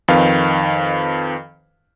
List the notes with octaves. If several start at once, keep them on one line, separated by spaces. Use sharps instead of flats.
F2 D#3 B4 F5